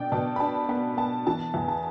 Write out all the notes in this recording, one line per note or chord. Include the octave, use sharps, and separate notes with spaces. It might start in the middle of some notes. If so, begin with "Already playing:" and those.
Already playing: B2 D4 D5 G5
B2 A5
B5
D4 A5
B3 B5
B3 A5
E3 A5
E2
A5